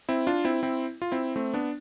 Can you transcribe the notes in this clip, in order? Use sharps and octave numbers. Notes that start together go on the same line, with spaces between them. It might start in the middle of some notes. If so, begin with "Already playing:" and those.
C4 E4
D4 F4
C4 E4
C4 E4
F4
C4 E4
A3 C4
B3 D4